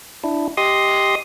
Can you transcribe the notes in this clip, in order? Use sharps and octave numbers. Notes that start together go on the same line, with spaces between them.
D4 E4
G4 D#5 C6 D#6